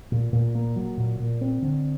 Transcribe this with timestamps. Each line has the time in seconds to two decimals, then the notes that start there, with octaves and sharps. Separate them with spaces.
0.12 A#2
0.33 A#2
0.55 A#3
0.76 F#3
0.97 A#2
1.20 A#2
1.41 C4
1.62 D3